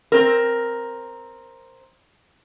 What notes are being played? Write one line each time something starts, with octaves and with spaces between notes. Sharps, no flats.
C4 A#4